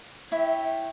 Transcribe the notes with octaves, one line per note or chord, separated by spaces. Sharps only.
E4 C#5 E5 G5